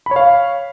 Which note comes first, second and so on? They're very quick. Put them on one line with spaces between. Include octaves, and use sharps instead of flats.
B5 C#5 F5